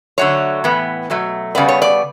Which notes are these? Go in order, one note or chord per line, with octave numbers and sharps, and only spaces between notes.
D3 F#3 A3 C#5
A2 E3 B3
B2 F#3 A3
C#3 G3 B3 D5
C#5
D5